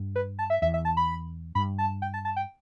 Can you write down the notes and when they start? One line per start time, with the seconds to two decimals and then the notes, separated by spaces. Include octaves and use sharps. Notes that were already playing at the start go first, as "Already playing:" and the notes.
Already playing: G2
0.16 B4
0.39 A5
0.50 E5
0.62 E2 E5
0.74 E5
0.85 A5
0.97 B5
1.55 G2 B5
1.78 A5
2.02 G5
2.14 A5
2.25 A5
2.36 G5